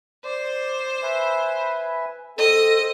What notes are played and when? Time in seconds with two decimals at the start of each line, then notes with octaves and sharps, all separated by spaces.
0.25 C5 D5
1.03 B4 E5 G#5
2.38 C4 A4 D#5